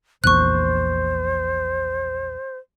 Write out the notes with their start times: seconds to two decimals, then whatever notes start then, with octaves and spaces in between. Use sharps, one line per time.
0.24 A#1 E2 A#2 C5 C#6 F#6